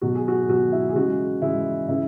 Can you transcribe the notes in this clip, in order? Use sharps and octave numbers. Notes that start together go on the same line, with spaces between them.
B2 F#3 F#4
G#4
F#4
B2 F#3 F#4
E4
G#4
C#3 E3 G#3 F#4
C#3 E3 G#3 E4
C#3 E3 E4